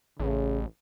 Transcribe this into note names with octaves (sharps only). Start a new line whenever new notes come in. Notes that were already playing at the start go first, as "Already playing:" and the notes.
A1 C#3